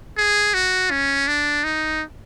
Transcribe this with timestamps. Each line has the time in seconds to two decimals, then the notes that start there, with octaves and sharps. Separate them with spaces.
0.17 G#4
0.54 F#4
0.91 C#4
1.28 D4
1.64 D#4